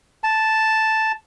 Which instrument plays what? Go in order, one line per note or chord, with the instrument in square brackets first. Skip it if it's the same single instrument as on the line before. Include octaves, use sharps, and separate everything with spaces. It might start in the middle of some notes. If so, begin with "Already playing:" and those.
[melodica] A5